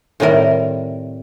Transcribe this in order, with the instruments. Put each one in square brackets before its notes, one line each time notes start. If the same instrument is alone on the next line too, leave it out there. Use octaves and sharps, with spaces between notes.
[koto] A2 C3 D#3 G3 A#4